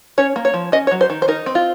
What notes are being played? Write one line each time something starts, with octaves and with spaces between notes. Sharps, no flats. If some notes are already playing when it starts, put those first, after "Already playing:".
C#4 C#5
A#3
C#5
F3
C#4 D#5
C#5
F#3
C5
D#3
C5
D#4 A#4
C4
F4